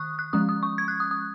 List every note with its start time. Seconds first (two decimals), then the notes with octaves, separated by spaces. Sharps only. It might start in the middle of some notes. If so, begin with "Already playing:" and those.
Already playing: D#3 C#6 D#6 F#6
0.19 F#6
0.33 F3 G#3 C#4 D#6
0.49 D#6
0.63 C#6
0.78 G#6
0.88 F#6
1.00 D#6
1.11 D#6